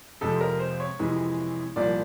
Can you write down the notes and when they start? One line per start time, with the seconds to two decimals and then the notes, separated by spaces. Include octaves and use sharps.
0.21 F2 C3 F3 G#3 A4
0.41 A#4
0.59 C5
0.80 C#5
0.99 F2 C3 E3 G#3
1.76 C2 A#2 F3 D5